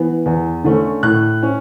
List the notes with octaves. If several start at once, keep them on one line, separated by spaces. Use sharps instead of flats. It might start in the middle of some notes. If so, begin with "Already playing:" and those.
Already playing: E3 B3
E2
D3 A3 C#4
A2 F#6
C#4